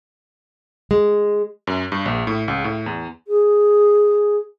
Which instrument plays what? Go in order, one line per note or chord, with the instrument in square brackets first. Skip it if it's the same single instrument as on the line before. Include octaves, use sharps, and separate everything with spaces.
[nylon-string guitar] G#3
[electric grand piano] F#2
G2
A#1
A2
C#2
A2
E2
[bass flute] G#4